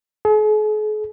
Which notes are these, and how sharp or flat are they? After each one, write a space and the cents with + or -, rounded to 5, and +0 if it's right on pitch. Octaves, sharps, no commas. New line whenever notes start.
G#4 +45